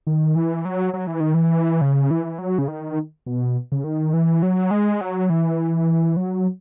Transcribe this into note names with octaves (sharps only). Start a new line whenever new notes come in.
D#3
E3
F#3
F#3
E3
D#3
E3
C#3
E3
F#3
C#3
D#3
B2
C#3
D#3
E3
F#3
G#3
F#3
E3
F#3